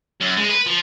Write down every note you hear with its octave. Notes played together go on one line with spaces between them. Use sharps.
F#2
G#3
B4
F3